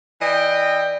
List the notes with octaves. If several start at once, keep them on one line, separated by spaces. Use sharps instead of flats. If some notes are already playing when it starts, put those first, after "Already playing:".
E3 D5 D#5 G5